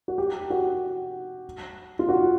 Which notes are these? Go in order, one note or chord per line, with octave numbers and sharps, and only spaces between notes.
F#4
G4
F#4
F4
F#4